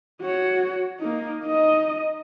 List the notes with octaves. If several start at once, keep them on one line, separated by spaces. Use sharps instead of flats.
F#4 C#5
A#3 D#4
D#4 D#5